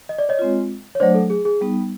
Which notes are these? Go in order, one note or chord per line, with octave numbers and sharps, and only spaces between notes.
D#5
D5
C#5 D#5
G#3 C4 F4
C#5
F#3 A3 D4 C5 D5
A4
G#4
G#4
G3 B3 D#4